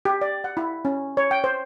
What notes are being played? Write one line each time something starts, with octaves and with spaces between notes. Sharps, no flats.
G4
D5
F#5
E4
C#4
C#5
G5
C5